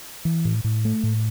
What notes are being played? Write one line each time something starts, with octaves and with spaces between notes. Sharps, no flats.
E3
A2
A2
A3
A2